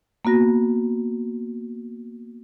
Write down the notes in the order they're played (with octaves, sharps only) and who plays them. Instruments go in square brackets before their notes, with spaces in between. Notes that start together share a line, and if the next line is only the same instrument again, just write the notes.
[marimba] A#3 B3 F#4 A#6